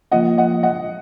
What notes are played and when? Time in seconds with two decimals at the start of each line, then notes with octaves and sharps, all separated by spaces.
0.12 C#3 F3 A#3 F4 D#5 F#5
0.38 D#5 F#5
0.63 D#5 F#5